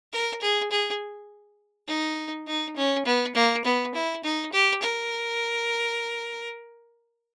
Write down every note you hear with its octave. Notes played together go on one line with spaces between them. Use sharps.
A#4
G#4
G#4
D#4
D#4
C#4
B3
A#3
B3
E4
D#4
G4
A#4